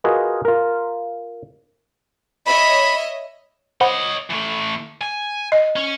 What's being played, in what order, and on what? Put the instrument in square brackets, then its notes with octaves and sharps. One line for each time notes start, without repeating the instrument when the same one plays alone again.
[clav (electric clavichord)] F4 F#4 G#4 A#4 B4 D#5
F4 A#4
[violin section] C#5 D#5 E5 [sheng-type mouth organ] B5
[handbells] C5 F#5 B5 [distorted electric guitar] C#5 D#5
[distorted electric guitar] E3 A3
G#5
[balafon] D#5
[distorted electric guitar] C#4